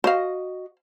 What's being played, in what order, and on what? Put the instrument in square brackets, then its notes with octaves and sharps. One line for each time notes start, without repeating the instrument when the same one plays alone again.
[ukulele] F#4 D#5 [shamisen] C5 F5